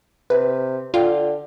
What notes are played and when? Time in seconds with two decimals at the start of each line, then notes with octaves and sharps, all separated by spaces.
0.30 C3 B4
0.94 D3 F4 F5 G5